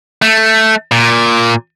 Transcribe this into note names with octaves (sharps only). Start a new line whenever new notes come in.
A3
A#2